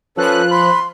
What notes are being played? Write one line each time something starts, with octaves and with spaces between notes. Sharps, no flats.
F3 C#4 A4 B4 F#6
B5 C6